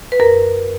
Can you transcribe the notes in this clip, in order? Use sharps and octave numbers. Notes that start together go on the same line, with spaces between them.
B4
F#2 A#4